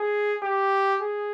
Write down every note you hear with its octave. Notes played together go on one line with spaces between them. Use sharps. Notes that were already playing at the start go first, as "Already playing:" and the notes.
Already playing: G#4
G4
G#4